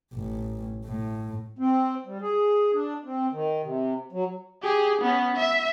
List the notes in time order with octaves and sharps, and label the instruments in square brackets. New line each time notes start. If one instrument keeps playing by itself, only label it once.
[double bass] A1
A2
[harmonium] C4
G3
G#4
D4
C4
D#3
C3
F#3
[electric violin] G4 G#4
B3 C#4
E5